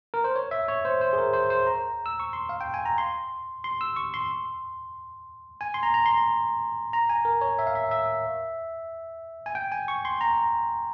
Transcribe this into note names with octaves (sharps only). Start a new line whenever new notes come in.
A#4
C5
C#5
E5
C#5
C5
C5
G#4
A#4
C5
C5
A#5
E6
C#6
C6
F5
G5
G#5
A#5
C6
C6
E6
C#6
C6
G#5
C6
A#5
A#5
C6
A#5
G#5
A#4
C#5
E5
F5
E5
E5
G#5
G5
G#5
C#6
C6
A#5